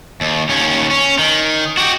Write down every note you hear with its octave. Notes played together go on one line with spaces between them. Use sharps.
D#2
D#2 C#4
C#4
D#3
F#4 G4